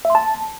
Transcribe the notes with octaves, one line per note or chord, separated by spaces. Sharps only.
E5
C6
A5